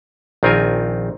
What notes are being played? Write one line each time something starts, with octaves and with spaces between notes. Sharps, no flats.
A#1 D#3 C4 F4 A#4 G#5